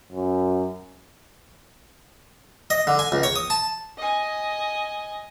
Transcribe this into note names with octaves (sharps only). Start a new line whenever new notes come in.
F#2
D#5
D3
G#5
C#2
C#5
D#6
A5
D#5 G#5